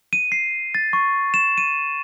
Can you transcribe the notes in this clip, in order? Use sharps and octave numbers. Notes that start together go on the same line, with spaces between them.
D#7
C7
A6
C#6
E7
D#7